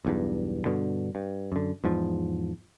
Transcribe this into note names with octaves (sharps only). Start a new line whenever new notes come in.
B1 E2 G2
G2 B2 D3
G2
F#2 D3
E2 G#2 F3